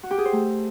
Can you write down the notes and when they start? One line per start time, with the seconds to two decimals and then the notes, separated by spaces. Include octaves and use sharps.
0.03 F#4
0.11 G4
0.18 G#4
0.25 C5
0.33 A3